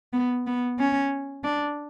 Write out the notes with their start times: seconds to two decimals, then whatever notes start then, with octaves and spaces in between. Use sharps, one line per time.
0.13 B3
0.47 B3
0.79 C#4
1.44 D4